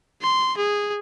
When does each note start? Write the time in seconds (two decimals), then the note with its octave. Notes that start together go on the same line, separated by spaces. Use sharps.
0.22 C6
0.57 G#4